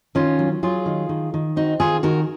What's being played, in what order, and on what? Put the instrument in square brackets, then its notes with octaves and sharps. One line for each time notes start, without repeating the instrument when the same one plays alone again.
[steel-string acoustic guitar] D#3 C#4 F4
F#3
F#3 F4 G#4
D#3
D#3
D#3
C4 D#4 F#4
D#3 F4 G#4
D#3 F#4 A#4